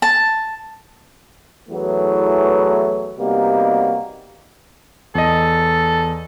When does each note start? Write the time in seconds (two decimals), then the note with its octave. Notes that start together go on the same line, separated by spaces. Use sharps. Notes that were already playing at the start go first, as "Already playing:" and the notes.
0.02 A5
1.70 E2 E3 F#3 A3 B3
3.19 C3 G3 A#3 B3 D#4 F#4
5.15 E2 A4 D#5